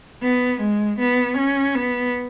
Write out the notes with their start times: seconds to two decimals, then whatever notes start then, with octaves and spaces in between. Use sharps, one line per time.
0.22 B3
0.60 G#3
0.99 B3
1.37 C#4
1.75 B3